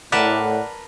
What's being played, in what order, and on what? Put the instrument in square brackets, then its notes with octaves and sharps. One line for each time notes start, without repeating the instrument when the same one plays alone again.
[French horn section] A2 [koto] A#4 B4 A5 [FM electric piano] D5 F#5